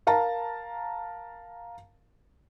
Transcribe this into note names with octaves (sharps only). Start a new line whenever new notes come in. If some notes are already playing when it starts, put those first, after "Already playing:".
A#4 F5 A5 A#5